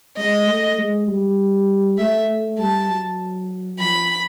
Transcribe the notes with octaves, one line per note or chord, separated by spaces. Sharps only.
G#3 D#5
A3
G#3
G3
A3 E5
G3 A5
F#3
F3 B5